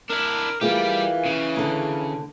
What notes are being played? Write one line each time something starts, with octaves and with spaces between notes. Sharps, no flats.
D4 E4 A#4
E3 G3 A#3 F4 G4 G#4
C#3
D#2 D3